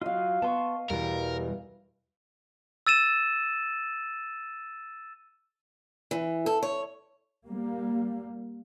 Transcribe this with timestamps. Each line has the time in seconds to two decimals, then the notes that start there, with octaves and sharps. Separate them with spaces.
0.02 F#3 F4 D#5 F5
0.42 B3 A5 C6 C#6
0.90 E2 B2 E3 G3 A#4
2.87 E6 A6 D#7 E7
6.11 E3
6.46 A4
6.63 C#5
7.46 G3 A#3